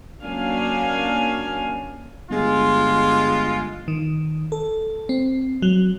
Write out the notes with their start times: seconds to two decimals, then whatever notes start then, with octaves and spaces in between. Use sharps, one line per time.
0.23 F#3 A#3 C#4 D4 F5 G#5
2.30 G1 G#3 F4
3.88 D#3
4.52 A4
5.09 C4
5.62 F#3